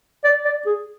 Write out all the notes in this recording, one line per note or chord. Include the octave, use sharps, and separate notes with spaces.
D5
D5
G#4